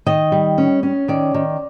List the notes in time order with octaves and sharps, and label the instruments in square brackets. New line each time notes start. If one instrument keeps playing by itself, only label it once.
[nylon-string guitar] D#3 D#5
G3
C#4
C#4
D#3 D5
D#3